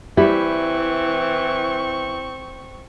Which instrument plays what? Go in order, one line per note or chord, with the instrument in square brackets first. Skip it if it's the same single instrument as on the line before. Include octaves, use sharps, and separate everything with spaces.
[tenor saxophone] E3 [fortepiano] G3 [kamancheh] C4 C#6 [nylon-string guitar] E4